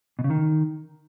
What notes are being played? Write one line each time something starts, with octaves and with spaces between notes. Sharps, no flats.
B2
C#3
D#3